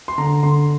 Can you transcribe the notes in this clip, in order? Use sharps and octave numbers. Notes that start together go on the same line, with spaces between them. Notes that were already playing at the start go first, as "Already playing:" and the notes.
C6
D3 A#5
D3 C6